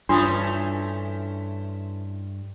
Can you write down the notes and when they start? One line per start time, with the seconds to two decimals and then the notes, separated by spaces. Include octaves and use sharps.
0.09 G2 E3 A3 C#4 D4 F4 C6 D#6